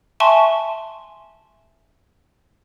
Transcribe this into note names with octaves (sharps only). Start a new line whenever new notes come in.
E5 G#5 A5 C6 C#6